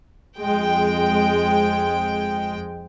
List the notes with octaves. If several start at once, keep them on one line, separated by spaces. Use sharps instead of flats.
F2 G#3 G5